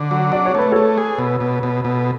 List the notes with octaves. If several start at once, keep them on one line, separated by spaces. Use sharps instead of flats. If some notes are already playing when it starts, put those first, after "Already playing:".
Already playing: D3
F#3
D4 D5
C#5
A3 B4
A3 A4 C#5
G#4
B2
B2
B2
B2